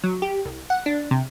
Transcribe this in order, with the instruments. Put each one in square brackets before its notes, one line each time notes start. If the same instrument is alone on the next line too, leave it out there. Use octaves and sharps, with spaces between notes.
[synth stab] F#3
G4
C2
F#5
D4
C3